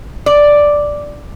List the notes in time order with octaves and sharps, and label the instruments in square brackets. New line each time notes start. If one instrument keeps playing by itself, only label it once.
[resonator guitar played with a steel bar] D5